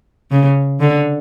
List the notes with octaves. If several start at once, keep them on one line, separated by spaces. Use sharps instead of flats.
C#3
D3